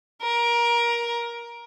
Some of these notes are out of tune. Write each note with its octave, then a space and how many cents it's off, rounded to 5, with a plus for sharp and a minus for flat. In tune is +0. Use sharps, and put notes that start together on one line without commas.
A#4 +20